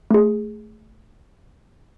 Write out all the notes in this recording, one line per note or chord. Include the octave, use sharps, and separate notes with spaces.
A3 G#4